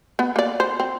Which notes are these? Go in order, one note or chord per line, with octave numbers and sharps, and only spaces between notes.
B3
A#3 D5
C5
C4